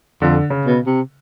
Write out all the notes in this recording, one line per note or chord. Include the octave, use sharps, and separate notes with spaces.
F2 D3
C#3
B2
C3